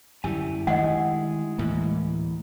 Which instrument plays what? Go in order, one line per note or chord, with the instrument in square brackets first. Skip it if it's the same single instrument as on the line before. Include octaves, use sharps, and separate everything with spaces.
[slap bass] F#2 D3 G3 [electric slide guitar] E4 G4 G#5
[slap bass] D#3 A3 D4 [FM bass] G#3 [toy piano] D#5 F#5
[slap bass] D2 A2 [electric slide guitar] E3 A#3